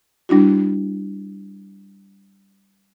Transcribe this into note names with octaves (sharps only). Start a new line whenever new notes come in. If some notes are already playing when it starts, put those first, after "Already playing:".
G3 D4 E4 F#4